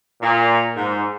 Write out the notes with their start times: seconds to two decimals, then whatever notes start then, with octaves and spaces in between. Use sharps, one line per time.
0.22 A#2
0.76 G#2